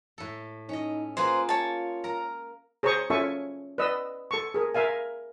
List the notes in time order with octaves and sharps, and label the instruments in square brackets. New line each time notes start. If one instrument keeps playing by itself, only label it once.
[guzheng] A2 A4
[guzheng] C#4 D#5 [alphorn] D#4
[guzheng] A#3 G#4 A#5 [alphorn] F4 [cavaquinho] B4 C5
[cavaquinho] C#5 A5
[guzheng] A#4 A#5
[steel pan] G#4 C5 C#5 A#5 C#6 D#6
C#4 F4 A4 E5 G#5 C#6
B4 D5 D#5 E6
A4 C#6
G#4 A#4
A#4 E5 F5 G#5